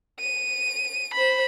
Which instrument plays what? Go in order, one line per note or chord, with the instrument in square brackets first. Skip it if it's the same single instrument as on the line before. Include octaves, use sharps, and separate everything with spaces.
[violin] D#7
C5 B5